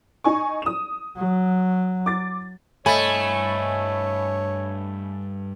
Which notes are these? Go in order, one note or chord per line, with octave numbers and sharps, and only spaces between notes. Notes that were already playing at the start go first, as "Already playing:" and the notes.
D#4 G#5 C#6
D#6 E7
F#3
D6 A6
G2 A3 C#5 D#5 G#5 B5